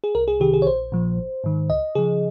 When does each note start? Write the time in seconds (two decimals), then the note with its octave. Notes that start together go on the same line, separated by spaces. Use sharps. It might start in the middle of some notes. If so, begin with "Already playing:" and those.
0.04 G#4
0.15 C2 A#4
0.28 G#4
0.40 C3 D#3 G4
0.53 G#4
0.62 C#5
0.66 A#1 C5
0.92 A#2 F3
1.18 G#1
1.44 G#2 D#3
1.70 C#2 D#5
1.95 C#3 F3 G#4